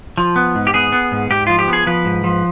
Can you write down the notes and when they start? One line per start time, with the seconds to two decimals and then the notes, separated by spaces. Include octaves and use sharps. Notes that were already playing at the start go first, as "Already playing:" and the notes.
0.17 F3
0.36 B3
0.55 G#2
0.67 G4
0.74 B3 G#4
0.92 B3
1.12 G#2
1.30 G#2 G4
1.47 F3 F4
1.59 G4
1.68 B3
1.73 G#4
1.87 F3 B4
2.05 G#2
2.24 F3